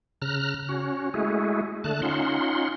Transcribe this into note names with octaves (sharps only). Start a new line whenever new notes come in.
C#3 A#5 F6 F#6
C#4 F#4
G#3 A3 E4 F#4 G#4
D3 A3 A5 F#6
C#4 D#4 F4 F#5 C6